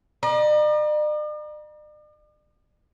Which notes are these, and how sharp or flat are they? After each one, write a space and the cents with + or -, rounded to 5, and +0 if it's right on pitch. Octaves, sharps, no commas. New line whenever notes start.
D5 +45 A#5 +35